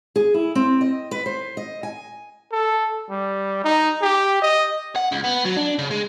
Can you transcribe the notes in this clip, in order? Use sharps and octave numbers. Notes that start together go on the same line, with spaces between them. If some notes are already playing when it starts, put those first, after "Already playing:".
G#4
E4
C4
D#5
B4
C5
D#5
G#5
A4
G3
D#4
G4
D#5
F#5
C#2
B3
F#3
D4
C#3
G#3